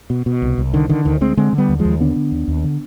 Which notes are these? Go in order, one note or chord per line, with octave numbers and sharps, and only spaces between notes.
B2
B2
C2
C2
D3 D#3
D3 D#3
D2 D#3
D2 G#3 C4
D3 G#3 C4
D3
G3 B3
D#2
F3 G#3
D#2
D3 B3 D4
D3
D#2
D#2
D3